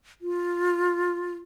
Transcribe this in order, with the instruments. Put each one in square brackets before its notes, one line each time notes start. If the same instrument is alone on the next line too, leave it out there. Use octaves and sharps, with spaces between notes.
[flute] F4